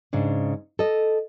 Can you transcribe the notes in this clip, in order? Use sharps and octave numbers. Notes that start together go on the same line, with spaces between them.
G#2 C#3 D4
A4 D#5